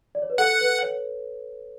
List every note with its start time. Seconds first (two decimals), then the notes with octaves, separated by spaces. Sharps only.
0.15 D5
0.22 C#5
0.30 B4
0.38 A4 F#5
0.61 B4
0.82 C#5